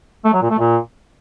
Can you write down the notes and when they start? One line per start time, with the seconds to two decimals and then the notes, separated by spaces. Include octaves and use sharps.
0.25 A3
0.33 F#3
0.42 A#2
0.50 A3
0.59 A#2